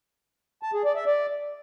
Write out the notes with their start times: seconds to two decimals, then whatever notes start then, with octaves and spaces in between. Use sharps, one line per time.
0.63 A5
0.74 G#4
0.84 D5
0.95 E5
1.06 D5